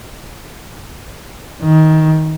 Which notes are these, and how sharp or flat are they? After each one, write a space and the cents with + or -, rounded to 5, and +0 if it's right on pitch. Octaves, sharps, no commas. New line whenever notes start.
D#3 +15